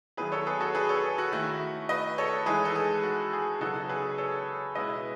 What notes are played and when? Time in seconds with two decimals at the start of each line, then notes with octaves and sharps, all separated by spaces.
0.17 D#3 F#3 B3 E4 G#4 B4
0.32 A4 C#5
0.47 G#4 B4
0.61 F#4 A4
0.75 G#4 B4
0.89 A4 C#5
1.04 G#4
1.18 F#4
1.32 D#3 A3 E4 F#4
1.89 B4 D#5
2.18 A4 C#5
2.46 E3 G#3 D#4 G#4 B4
2.65 A4
2.75 G#4
3.03 F#4
3.33 G#4
3.61 C#3 F#3 B3 D#4 F#4 A4
3.89 G#4 B4
4.18 A4 C#5
4.75 B2 G#3 C#4 E4 B4 D#5